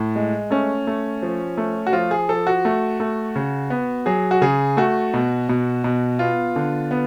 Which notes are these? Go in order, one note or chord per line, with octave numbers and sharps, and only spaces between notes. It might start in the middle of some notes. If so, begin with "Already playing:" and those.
Already playing: A2
G#3
A3 C#4
A3
F3
A3
F#4
F3 F4
G#4
F3 A4
F#4
A3
A3
C#3
B3
F#3 G#4
F#4
C#3 G#4
A3 F#4
B2
B2
B2
B3 F4
D3
B3